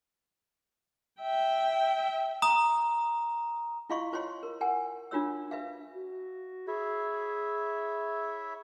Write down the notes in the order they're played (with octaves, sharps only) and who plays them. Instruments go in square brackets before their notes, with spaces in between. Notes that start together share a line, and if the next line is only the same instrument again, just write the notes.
[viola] E5 G5
[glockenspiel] A#5 D#6
[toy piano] E4 F4 D#5 F5 C6 C#6
F4 C5 C#5 C6
A#4
A#4 F#5 G#5
D4 F4 F#4 C#5 E6
B4 E5 F5
[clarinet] F#4
[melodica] E4 C#5 E5 [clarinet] G#4